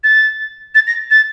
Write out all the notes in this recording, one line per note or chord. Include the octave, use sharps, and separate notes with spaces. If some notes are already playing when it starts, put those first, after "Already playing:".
A6
A6
A#6
A6